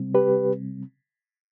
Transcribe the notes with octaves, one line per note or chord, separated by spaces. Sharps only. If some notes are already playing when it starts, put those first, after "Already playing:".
Already playing: C3 G3 C4
G4 B4